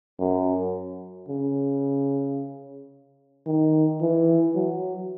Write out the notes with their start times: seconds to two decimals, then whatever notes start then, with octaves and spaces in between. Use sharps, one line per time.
0.20 F#2
1.29 C#3
3.46 D#3
4.02 E3
4.55 F#3